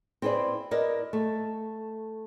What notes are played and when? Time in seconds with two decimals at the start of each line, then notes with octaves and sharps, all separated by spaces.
0.22 C4 E4 G#4 B4 D5
0.71 E4 A#4 B4 D5 D#5
1.13 A3